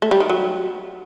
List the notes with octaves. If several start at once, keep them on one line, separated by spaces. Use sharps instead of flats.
A3
G3
D#3
F#3